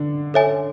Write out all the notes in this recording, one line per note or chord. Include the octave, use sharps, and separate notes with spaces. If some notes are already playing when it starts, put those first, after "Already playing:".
Already playing: D3 D4
A4 C#5 E5 G#5